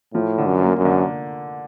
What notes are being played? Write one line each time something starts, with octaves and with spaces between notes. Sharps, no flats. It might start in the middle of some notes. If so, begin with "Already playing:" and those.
A2 F3
D3
F#2
A#3
F#2
D3